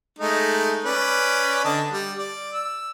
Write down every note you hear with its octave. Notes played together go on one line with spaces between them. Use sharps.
G#3 A3 D#4
C#4 B4 D5
D3 D#5 A5
G3
D5
E6